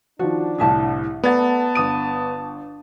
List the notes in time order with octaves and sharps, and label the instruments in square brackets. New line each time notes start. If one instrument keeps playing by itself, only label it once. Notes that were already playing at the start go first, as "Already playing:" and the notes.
[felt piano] D#3 F3 [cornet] D4 [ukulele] F#4
[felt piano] C2 A2 D3 [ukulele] G#4 E5 A5
[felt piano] A3 A6 [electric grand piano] B3 [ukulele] D5 F#5 A#5 [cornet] A5
[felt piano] G1 D#6 D#7